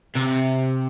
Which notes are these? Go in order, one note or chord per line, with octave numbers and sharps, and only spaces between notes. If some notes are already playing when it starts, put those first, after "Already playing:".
C3